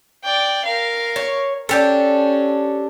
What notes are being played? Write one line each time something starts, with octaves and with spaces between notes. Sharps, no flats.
D5 G5
A#4 F5
C#5
C#4 D4 G4 A4